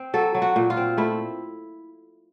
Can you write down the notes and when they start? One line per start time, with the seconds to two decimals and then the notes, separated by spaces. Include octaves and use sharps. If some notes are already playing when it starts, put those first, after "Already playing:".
Already playing: C4
0.14 F#3 A4
0.35 F#3
0.42 F#4
0.56 A#2
0.70 F4
0.77 C4
0.97 A3 E4